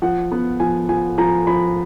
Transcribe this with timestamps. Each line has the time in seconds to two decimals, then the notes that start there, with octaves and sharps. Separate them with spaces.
0.02 F3 F#5
0.32 B3
0.60 F3 G#5
0.89 F3 G#5
1.18 F3 A#5
1.47 F3 B5